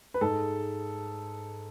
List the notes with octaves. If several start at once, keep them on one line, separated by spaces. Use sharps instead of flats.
B4
G#2 G#3 A4